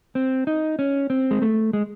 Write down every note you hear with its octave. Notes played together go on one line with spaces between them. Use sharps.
C4
D#4
C#4
C4
G#3
A3
G#3